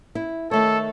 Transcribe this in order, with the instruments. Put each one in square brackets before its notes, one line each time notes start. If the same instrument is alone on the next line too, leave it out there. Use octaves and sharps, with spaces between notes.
[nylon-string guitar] E4
[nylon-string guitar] D#3 A3 C#5 [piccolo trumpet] A4